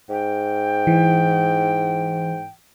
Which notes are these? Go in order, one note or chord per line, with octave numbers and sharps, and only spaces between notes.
G#2 G5
E3